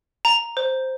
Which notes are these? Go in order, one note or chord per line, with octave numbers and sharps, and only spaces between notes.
A#5
C5